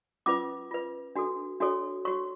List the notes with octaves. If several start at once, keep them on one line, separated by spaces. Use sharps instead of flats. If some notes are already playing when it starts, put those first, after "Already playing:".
C#4 F4 B4 D6
F4 B4
D4 F#4 A4
D4 F#4 A4 C#5
F#4 C#5 C#6